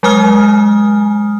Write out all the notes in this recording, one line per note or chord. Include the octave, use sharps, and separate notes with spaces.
F#3 G#3 G#5 D#6 F6